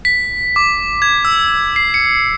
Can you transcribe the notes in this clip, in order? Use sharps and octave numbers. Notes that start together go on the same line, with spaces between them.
B6
D6
G#6
E6
C7
C#7